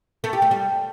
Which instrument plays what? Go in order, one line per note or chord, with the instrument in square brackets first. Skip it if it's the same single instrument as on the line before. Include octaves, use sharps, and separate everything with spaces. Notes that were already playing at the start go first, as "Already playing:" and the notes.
[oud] A3
G4
A3
G3